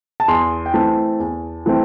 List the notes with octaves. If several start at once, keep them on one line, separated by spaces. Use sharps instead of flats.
A5
E2 C6
G5
E3 A3 C4 A5
E2
E3 A3 C4